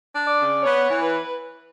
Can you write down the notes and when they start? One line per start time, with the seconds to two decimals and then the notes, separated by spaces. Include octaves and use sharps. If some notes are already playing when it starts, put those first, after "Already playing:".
0.13 D4
0.26 D5
0.38 C#3
0.63 B3 C#5
0.89 E3
1.01 B4